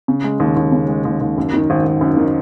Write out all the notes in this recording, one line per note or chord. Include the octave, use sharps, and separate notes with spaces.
C#3
G#3
D#2
D#2
C#3
G#3
D#2
D#2
F#2
D#3
G#1
G#1
F#2
D#3